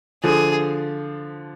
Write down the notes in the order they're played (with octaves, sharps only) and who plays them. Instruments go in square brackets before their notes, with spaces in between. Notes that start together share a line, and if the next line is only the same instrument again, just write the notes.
[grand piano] D3 F3 [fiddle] G#4